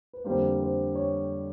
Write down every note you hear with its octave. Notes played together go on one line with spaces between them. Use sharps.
B4
F2 D3 G3 A#3 C5
C5
C#5